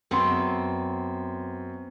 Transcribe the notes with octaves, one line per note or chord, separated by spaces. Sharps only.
F#2 B3 C4 C6